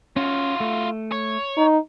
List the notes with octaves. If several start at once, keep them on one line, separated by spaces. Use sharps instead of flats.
C#4 F4 F#4
A3
C#5
D#4